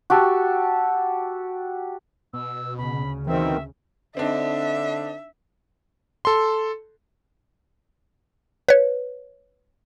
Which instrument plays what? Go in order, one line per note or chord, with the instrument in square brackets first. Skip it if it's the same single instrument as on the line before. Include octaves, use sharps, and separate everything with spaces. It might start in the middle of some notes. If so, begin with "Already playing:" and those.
[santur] F#4 G4 A4
[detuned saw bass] B2 [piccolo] E6
[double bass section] D2 C#3 [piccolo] B5
[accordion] B2 D#3 C4 [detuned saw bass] E3 [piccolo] E5
[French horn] D3 [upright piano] C4 D4 D#4 [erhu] E5
[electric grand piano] A4 C6
[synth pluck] B4 C#5